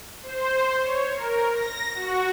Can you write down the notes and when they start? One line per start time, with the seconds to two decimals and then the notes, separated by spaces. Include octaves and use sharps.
0.23 C5
0.81 C#5
1.15 A#4
1.53 A#6
1.94 F#4